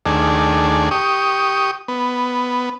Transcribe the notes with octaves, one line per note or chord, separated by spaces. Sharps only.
D#2 A3 D4 G#4
G4 C#6 D#6
B3